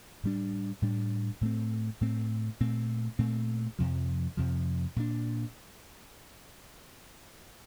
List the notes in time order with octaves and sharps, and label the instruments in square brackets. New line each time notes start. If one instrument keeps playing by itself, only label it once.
[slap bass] A2 G3 D4
A2 G3 D4
A2 A3 C4
A2 A3 C4
A#2 A3 C4
A#2 A3 C4
F2 C3 F3
F2 C3 F3
A#2 A3 D4